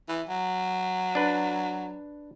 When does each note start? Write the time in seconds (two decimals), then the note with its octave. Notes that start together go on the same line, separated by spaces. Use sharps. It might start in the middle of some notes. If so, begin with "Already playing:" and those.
0.09 E3
0.29 F#3
1.15 D4 B4